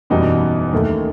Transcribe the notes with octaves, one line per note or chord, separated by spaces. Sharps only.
F#1 E2 B2 G3 D#4
D#2 D#3 A3